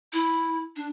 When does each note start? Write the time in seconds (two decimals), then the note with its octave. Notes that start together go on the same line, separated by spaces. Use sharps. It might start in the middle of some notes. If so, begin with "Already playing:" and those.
0.13 E4
0.76 D4